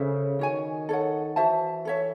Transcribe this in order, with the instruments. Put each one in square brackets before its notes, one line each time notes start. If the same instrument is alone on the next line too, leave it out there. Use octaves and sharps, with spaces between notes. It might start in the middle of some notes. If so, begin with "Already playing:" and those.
Already playing: [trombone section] C#3 [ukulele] A4 C5 E5
[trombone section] D#3 [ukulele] F#4 C#5 G#5
[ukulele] A4 C#5 F#5
[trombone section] E3 [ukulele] F#4 C5 E5 A5
[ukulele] A4 C#5 E5